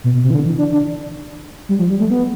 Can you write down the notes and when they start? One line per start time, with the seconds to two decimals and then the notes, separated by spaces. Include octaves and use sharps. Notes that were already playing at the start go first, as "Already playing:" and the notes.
0.04 B2
0.14 B2
0.24 C3
0.30 E3
0.35 D3
0.45 E3
0.58 D4
0.73 D4
1.69 G3
1.79 F3
1.90 G3
2.00 A3
2.10 B3